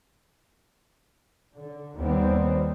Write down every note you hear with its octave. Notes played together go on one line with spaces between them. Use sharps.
D3
D#2 G3 B3 C4